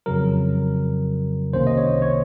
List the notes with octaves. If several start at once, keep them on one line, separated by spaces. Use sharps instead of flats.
F2 C#3 F#3 A#4
C2 C3 D#3 A#3 C#4 C5
D#5
C#5
C#5